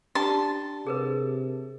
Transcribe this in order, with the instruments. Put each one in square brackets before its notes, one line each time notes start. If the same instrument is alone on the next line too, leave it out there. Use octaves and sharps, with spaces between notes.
[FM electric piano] D4 G4 [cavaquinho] A5 C6
[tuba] C3 [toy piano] G#4 A#4 B4